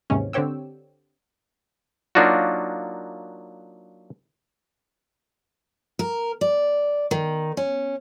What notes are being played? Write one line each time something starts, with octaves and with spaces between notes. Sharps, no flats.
D#2 G#2 C3 E3 G#3 C#4
D3 C4 G4 C#5 G5 E6
F#3 A#3 D4 D#4 F4 F#4
A#4
D5
D#3
C#4